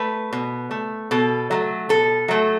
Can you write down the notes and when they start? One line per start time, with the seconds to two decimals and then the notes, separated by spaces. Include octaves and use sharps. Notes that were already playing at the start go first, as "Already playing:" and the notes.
Already playing: A3 B4
0.33 B2
0.71 A3
1.11 B2 A4
1.51 F#3 A3
1.89 B2 A4
2.28 F#3 A3